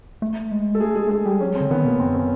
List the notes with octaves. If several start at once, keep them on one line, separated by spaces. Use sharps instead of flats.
A3
G#3
A4
A3 G#4
G#3 G#4
A3
G#3 G#4
G3 G4
F#3 C#4
C4
D3
D#3 B3
B2 A#3
F#2 C4
C#4